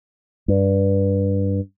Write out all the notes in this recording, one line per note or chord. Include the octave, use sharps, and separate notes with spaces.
G2